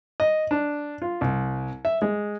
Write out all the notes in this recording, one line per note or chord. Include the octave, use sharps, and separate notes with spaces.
D#5
D4
F4
C2
E5
G#3